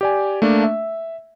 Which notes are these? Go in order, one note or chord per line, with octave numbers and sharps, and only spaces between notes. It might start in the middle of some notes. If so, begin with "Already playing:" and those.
G4 D5 G#5
A3 A#3 D4
E5